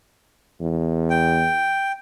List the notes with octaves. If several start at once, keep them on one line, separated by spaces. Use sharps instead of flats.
E2
G5